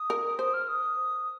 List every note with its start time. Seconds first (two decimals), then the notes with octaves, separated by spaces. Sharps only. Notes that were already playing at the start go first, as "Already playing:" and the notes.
Already playing: D#6
0.10 A#4
0.39 C5 D#6
0.53 F6
0.68 D#6